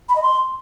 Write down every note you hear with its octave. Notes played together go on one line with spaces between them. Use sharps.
B5
D#5
C6